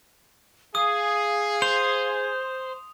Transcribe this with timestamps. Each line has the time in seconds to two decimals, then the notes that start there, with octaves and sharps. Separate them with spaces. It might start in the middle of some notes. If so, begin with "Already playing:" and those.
0.75 G#4 F5 D#6
1.62 C5 F7